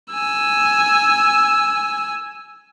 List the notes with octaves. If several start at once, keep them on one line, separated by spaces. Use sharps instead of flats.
G#5 E6